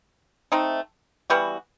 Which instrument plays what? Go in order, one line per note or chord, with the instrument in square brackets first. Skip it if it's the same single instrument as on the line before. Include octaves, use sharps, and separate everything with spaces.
[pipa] A3 C4 D#4
E3 G3 B3 F#4